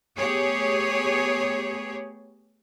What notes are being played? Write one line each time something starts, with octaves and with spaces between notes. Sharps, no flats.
A3 B3 G4 G#4 C#5